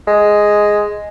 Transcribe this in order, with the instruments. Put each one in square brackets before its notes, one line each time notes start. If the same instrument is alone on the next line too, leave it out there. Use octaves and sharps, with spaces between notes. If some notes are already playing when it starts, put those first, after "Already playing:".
[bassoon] G#3